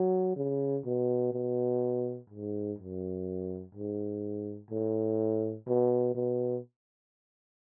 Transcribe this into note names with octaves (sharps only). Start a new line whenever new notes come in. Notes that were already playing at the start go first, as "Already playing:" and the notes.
Already playing: F#3
C#3
B2
B2
G#2
F#2
G#2
A2
B2
B2